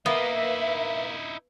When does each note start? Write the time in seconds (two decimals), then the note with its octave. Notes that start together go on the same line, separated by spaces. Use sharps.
0.06 A#3 B3 D#4 E4 B4 E5